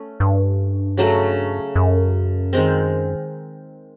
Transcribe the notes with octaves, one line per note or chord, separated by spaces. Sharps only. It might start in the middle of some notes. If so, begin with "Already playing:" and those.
Already playing: A3 C#4
G2
C#3 F#3 A3
F#2
D#3 G#3 C4